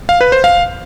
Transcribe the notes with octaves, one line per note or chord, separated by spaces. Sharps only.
F5
B4
C5
F5